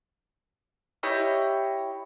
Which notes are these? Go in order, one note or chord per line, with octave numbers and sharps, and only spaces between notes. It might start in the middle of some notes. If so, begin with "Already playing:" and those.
E4 G4 C#5 D#5